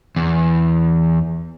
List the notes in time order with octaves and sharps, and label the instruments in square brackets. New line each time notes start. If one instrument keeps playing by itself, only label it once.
[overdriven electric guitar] E2